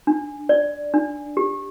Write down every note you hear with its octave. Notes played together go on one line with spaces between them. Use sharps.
D4
D5
D4
G4